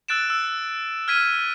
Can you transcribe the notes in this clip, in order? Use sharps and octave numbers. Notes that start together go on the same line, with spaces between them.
E6 F#6 A6 D7 E7
E6
F6 G#6 B6 D#7